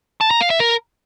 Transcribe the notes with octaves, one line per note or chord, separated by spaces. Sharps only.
A5
A#5
F5
E5
A#4